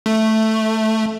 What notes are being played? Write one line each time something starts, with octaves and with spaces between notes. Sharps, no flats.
A3